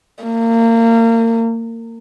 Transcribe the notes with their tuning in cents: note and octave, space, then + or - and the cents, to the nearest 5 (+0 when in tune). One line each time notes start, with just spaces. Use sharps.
A#3 -30